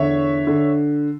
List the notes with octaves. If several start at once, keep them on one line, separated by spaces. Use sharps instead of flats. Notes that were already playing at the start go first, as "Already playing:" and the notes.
Already playing: E2 D3 C#5 E5
D3